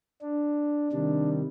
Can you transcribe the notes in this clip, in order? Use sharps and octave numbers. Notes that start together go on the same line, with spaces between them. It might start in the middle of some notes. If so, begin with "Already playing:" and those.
D4
C3 D#3 G3 D4